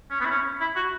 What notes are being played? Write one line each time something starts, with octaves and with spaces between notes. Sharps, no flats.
C#4
B3
E4
C#4
E4
F#4